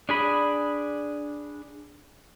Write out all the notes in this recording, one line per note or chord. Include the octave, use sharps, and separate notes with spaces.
D4 G#4 B5